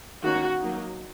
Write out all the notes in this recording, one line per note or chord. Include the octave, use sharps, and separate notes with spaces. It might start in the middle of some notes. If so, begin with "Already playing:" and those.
D#3 A#3 C#4 F#4
F#3 A#3 D#4